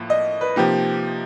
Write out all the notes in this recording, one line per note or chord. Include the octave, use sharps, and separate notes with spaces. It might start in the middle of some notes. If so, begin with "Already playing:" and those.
Already playing: A2 F3 A#3
D#5
B4
C3 F3 A#3 D#4 G4